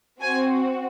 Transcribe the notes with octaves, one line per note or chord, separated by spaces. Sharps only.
C4 F#4 G#5